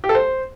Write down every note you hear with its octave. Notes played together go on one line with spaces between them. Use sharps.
G4
A4
C5